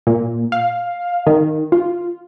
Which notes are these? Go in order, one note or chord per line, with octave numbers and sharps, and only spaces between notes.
A#2
F5
D#3
F4